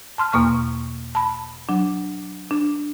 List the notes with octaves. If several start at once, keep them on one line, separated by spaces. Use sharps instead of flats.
A5 C6 F6
E2 B2 A#3 C#6 F6
A5 B5
F#3 D4
D4